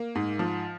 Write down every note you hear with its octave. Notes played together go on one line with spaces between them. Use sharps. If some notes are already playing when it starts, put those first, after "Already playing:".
Already playing: A#3
G#2
F3